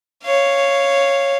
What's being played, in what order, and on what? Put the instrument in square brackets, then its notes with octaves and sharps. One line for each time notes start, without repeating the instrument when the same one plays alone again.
[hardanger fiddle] C#5 F5